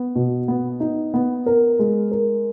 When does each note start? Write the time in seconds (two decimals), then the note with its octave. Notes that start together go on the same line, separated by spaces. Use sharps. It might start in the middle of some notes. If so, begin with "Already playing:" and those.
Already playing: B3
0.15 B2
0.48 B3
0.80 D#4
1.14 B3
1.46 A#4
1.79 G#3
2.11 A#4